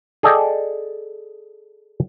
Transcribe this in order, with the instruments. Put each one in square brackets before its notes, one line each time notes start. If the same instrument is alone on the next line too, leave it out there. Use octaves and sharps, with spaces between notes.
[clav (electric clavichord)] G#4 A4 D5 D#5 G5